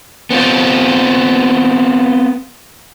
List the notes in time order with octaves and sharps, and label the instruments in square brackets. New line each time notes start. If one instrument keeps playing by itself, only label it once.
[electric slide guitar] B3 C4 F4